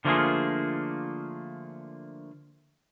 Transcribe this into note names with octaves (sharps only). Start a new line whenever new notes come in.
D3 F3 A3 A#3 F4 G#4